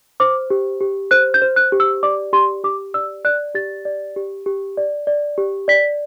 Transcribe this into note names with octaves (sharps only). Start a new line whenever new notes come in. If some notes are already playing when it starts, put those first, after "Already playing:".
C5 D6
G4
G4
C5 F#6
G6
C5
F#6
G4
E6
D5 D6
G4 C6
G4 D6
D5 E6
D5 F#6
G4 A6
D5
G4
G4
D5
D5
G4
D5 B6